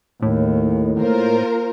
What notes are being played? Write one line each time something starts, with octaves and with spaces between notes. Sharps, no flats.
D#2 A2
A#3 F4 A#4 C5